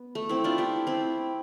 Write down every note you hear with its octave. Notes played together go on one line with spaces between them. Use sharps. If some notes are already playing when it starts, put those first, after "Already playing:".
Already playing: B3
A3
C4 E4
D4 F4
E4 G4
C4 E4